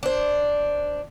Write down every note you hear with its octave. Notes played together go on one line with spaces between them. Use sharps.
D4 C5